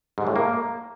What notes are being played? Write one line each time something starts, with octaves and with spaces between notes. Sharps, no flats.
G#2
A2
A#3